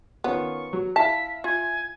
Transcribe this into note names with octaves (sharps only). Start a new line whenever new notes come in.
D#3 B3 C#4 F4 C#6
F#3
E4 E5 F5 A5 B6
F4 G#5